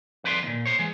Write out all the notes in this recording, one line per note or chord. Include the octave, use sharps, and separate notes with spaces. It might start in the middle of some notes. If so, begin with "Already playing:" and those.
F2 B4 D5 A#5 C6
D#2 A#2
C5 C#5
E3 G#3